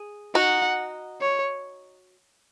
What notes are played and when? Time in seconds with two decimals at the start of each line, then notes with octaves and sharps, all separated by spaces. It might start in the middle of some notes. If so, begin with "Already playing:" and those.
Already playing: G#4
0.35 D#4 F#4 F#5
1.21 C#5